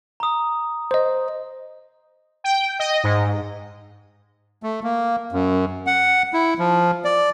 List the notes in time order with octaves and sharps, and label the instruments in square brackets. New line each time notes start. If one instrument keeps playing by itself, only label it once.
[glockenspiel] A#5 D#6
[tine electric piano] C5 D#5
[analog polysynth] G5
D#5
G#2
[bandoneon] A3
A#3
F#2
F#5
E4
F3
D5